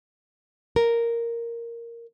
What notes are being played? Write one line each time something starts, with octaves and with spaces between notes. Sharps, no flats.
A#4